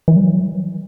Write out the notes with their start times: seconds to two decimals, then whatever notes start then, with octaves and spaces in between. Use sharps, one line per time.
0.08 E3
0.16 G3
0.24 F#3